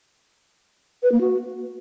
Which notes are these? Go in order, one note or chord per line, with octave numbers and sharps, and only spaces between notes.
B4
A#3
F#4